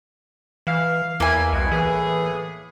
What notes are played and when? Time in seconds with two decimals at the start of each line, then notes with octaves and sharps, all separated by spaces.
0.67 E3 F5
1.20 E2 A#3 E4 G#5
1.52 C2 B2
1.71 A2 E3 B3 G#4